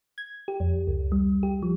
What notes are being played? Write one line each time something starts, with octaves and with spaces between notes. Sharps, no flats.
G#6
G4
F2
C#2
G3
G4
F3